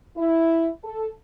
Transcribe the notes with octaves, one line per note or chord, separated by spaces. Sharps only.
E4
A4